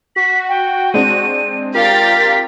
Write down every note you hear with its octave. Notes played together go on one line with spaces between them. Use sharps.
F#4 B6
G5
G#3 C4 D4 D#7
F4 G4 A#4 F5 G5 A6 B6